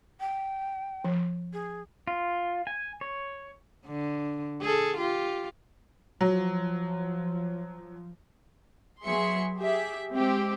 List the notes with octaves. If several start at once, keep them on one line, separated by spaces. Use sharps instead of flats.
G5
F3
G#4
F4
G#5
C#5
D3
G#4 A4
F4 G4
F3 F#3
F#3 B3 G#4 E5 C6 C#7
G4 G#4 E5
G#3 C4 G4